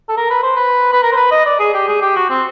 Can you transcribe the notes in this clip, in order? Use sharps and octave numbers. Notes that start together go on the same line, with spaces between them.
A4
A#4
B4
C5
B4
B4
A#4
C5
B4
D#5
D5
G#4
G4
G#4
G4
F#4
C4